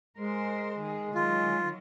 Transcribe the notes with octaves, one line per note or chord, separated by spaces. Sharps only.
G#3 A#4 C5
D#3 G#4
D#3 F#3 F4